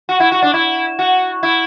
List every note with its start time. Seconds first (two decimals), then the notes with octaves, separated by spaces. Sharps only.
0.09 F#4
0.20 E4
0.32 F#4
0.42 D4
0.54 E4
0.99 F#4
1.43 E4